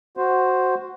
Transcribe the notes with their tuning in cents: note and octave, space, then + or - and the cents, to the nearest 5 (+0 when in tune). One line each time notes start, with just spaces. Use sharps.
F#4 +0 C5 +0